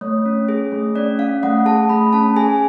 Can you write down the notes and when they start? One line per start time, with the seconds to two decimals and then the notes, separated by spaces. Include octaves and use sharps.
0.01 A3 C#5
0.26 C#4
0.49 G#4
0.72 A3
0.95 C#4 D5
1.19 C#4 F5
1.43 A3 F#5
1.66 G#4 A5
1.89 A3 B5
2.13 C#4 A5
2.36 G#4 G#5